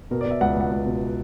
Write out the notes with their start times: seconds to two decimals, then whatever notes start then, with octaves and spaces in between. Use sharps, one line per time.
0.11 B2 A#4
0.21 D5
0.26 B2
0.31 E5
0.41 C#2 F#5
0.56 C#2 F#5
0.71 C#2
0.86 B2